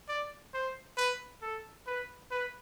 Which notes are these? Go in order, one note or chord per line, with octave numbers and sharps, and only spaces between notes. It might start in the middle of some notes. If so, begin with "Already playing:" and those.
D5
C5
B4
A4
B4
B4